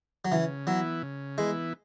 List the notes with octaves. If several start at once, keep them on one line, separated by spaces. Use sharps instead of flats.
F#3
C#3 E3
E3 F#3 B3 E4
C#3
E3 G#3 B3 E4